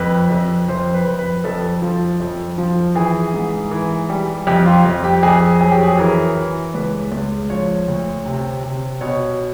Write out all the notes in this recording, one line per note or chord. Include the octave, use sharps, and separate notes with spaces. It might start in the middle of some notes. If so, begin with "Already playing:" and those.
Already playing: F2 B4
F2
F2 C5
B4
F2
B4
F2 A4
F3
F2
F3
E3 G#4
G#2
E3
G3
F2 G4
F4
F2
G4
F2 G#4
F#3 G#4
G4
G#4
E3 A#4
E3
C#2 B4
C#2
F3 C#5
D2
C3
C3
B2 C#5